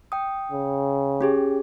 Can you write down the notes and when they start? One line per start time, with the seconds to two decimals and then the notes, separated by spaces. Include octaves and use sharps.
0.12 G5 D#6
0.52 C#3
1.21 C#4 G4 G#4